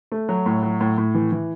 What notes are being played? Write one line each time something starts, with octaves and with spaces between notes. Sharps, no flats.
A3
F#3
A2
F#3
A2
A2
E3
E3